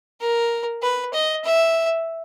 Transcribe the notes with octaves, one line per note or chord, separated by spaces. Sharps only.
A#4
B4
D#5
E5